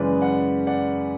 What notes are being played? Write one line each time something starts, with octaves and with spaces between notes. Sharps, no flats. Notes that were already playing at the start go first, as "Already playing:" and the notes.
Already playing: F#2 C#3 E3 G#3 B4 D5
D5 F#5
D5 F#5